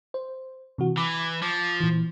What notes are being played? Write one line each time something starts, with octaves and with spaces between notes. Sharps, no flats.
C5
C3 E3 F#4
E3 D6
F3 D6
A#2 E3